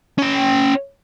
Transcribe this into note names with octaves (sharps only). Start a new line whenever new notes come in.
C#4 G5